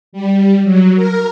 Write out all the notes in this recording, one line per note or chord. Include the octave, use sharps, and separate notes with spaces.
G3
F#3
A#4